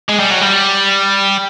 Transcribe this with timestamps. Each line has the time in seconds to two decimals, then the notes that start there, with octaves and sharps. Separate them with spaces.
0.09 G#3
0.20 G3
0.31 F#3
0.41 G3